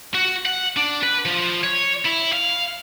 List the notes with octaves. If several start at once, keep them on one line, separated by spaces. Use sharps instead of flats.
F#4
F#5
D4
B4
F3
C#5
E4
F5